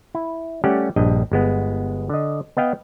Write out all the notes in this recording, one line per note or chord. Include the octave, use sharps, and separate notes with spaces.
E4
G3 A3 C#4 G4 F#5
A#1 G2 D#5
G1 G#3 B3
D3 D#5
B3 D#5 F5 G5